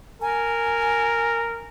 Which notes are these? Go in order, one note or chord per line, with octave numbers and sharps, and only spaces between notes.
A#4 G#5